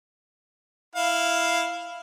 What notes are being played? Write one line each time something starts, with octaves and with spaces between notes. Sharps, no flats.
E4 F5